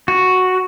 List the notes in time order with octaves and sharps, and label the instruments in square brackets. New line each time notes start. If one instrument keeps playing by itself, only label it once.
[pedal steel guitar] F#4